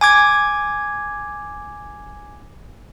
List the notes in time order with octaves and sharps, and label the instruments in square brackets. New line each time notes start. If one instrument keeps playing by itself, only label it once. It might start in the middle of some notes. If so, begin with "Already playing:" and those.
[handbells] G#5 D6 G#6